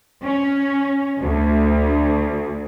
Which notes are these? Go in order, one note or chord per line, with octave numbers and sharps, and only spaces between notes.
C#4
D2